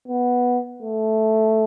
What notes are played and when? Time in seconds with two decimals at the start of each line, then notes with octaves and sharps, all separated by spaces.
0.08 B3
0.82 A3